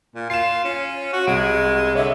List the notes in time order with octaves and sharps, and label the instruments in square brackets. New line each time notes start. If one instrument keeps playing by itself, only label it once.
[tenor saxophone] A#2
[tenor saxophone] F4 [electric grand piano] C7 E7
[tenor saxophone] C#4
F#4
[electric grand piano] C2 D7 [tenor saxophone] G#3
[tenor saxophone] D3 [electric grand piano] C#5 D#5 E5